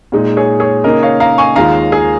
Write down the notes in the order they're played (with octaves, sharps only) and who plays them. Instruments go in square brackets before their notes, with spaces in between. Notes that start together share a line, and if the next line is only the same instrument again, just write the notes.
[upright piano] A#2 G#3 D#4
[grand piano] G#4 C#5
G#4 C#5
[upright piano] C#3 A#3 D#4 [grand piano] A#4 D#5
[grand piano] C#5 F5
F5 A#5
G#5 C#6
[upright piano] D#2 D#3 G#3 F4 G#4 [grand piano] F5 A#5
[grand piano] G#4